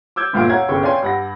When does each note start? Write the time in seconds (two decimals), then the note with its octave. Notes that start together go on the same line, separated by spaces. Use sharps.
0.16 D6 E6 G6 G#6
0.33 G1 D2 A#2 F4 F5 D7
0.50 C#5 F5 F#5 A#5 G#6
0.68 G1 C2 C#3 G5 C#6
0.83 C#5 D5 F5 G5 G#5 C6
1.02 G2 F#5 A#6